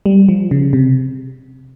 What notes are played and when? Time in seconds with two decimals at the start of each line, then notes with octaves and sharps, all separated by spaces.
0.06 G3
0.29 F3
0.51 C#3
0.73 C3